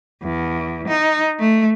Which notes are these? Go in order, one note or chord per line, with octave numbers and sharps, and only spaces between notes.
E2
D#4
A3